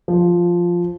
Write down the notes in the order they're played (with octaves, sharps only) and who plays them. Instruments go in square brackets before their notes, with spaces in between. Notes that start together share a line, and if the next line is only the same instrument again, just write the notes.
[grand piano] F3